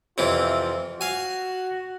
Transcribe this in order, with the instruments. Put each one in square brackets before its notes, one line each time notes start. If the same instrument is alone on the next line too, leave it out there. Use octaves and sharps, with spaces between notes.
[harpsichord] F2 C3 E3 [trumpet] F4
[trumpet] F#4 [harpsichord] F5 G#5